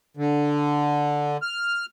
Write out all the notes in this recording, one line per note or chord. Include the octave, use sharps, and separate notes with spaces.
D3
F6